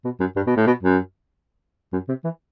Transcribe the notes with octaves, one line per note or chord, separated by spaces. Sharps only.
B2
F#2
G2
B2
A2
B2
F#2
F#2
C3
E3